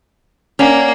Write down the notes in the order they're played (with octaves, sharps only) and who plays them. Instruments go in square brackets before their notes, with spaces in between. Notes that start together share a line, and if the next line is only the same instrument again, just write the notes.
[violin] A#3 [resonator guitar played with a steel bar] C#4 [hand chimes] D5 F#5 G#5